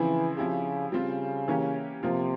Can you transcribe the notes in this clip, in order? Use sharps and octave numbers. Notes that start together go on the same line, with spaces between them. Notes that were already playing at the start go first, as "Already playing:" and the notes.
Already playing: C#3 E3 F3 C4 E4
C#3 F3 C4 E4 G4
C#3 G3 C4 F4
E3 A#3 C#4 G4
C3 F3 A#3 F4